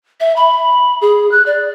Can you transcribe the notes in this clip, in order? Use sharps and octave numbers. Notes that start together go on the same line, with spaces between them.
E5
B5
G#4
F#6
D5